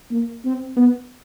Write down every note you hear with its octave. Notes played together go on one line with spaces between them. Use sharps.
A#3
C4
B3